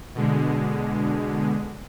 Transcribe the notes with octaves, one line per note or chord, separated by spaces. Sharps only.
B2 D3 G#3